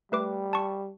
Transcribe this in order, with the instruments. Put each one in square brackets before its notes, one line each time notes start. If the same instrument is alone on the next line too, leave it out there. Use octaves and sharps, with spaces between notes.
[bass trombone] G3 [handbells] A3 B4 D6
[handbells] A5 C#6